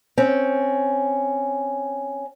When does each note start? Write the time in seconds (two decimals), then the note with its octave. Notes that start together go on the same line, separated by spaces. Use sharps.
0.17 C4 C#4